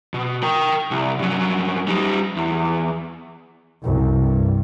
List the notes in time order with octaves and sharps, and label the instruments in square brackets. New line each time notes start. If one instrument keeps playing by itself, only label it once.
[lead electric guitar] B2
A#4 G5
C2
G2 F#3
G3 D#4
E2
[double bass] C2 F#2
G2